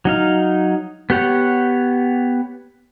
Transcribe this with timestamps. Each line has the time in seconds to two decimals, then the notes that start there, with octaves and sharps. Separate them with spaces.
0.05 F#3 D#4 F5
1.10 B3 G4 C#5 F#5